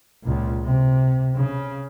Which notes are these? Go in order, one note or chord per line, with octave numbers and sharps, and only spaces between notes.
C#2 A#2
C3
C#3